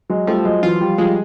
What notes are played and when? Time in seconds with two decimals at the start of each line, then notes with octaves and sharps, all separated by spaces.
0.10 F#3 G#3
0.27 F3 G3 A3
0.45 F#3 G#3
0.63 E3 F#3 F4
0.80 F3 G3
0.98 F3 G3 G#3